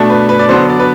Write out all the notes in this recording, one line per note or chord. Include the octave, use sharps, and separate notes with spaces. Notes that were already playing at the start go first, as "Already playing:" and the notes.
Already playing: B2 A3 D4
B4
B4
D5
D3 F#3 B3 D4 C5
D5
B4